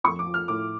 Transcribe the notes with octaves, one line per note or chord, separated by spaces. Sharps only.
F2 C#6
D6
F3
F6
A2 D6